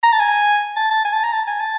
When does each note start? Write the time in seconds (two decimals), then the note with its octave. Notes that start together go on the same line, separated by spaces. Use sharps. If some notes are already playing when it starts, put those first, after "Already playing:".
0.03 A#5
0.12 A5
0.20 G#5
0.76 A5
0.91 A5
1.05 G#5
1.13 A5
1.23 A#5
1.32 A5
1.47 G#5
1.60 A5